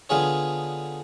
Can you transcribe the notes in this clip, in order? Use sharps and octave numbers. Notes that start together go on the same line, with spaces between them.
D3 B3 F4 G#4 C#5